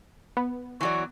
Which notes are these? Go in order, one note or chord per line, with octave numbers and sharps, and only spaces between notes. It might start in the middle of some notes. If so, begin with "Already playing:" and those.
B3
E3 F#3 D5 C#6